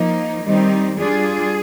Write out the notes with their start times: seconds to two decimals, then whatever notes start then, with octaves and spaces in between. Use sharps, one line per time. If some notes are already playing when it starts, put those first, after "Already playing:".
Already playing: F3 A#3 D#4
0.45 D#3 G3 C4 D#4
0.99 G3 D4 F4 G#4